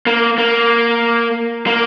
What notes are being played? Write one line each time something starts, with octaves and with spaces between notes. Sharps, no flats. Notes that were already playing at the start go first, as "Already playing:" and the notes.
A#3
A#3
A#3